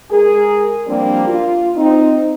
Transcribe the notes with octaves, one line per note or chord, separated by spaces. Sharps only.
G#3 G#4 A#4
F3 G3 A#3 C4 D4
F4
C4 D#4